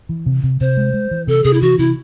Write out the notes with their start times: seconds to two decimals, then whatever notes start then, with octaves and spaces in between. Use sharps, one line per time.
0.09 E3
0.26 C3
0.43 C3
0.61 C3 C5
0.77 G#3
0.93 G#3
1.11 E3
1.27 C3 A4
1.44 C3 G#4
1.53 E4
1.62 E3 F#4
1.79 C3 E4